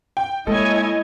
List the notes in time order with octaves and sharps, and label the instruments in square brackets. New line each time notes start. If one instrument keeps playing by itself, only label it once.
[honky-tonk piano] G5
[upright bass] G#3 A#3 [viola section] E4 C#5 G#5 [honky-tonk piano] A4 [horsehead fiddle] D#5